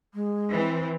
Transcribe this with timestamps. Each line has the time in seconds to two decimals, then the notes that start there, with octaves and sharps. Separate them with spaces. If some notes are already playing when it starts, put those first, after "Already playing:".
0.14 G#3
0.49 E3 C4